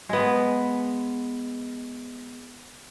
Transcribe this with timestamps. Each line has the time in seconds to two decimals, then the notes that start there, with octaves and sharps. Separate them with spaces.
0.09 G#3 B3